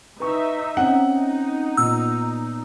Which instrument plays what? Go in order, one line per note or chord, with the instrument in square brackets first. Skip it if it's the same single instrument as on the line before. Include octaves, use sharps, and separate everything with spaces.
[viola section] D#4 E5 [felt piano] B4 C#6
[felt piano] C4 C#4 [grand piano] F#5
[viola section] D#4
[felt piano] A#2 B3 [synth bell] E6